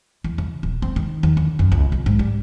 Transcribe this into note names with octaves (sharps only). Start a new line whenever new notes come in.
E2
C#3
D#1
C4
D#3
D#2
D3
F#2
C#2
C2
G#2
G3